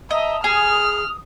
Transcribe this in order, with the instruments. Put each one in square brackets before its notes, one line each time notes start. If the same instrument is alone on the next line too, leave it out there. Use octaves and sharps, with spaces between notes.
[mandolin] D#5 [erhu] E5 [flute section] A5 A#5 D#6
[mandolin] G#4 [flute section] D#6 [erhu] F6